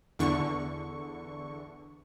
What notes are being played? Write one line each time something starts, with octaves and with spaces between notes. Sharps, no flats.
E2 D3 C#6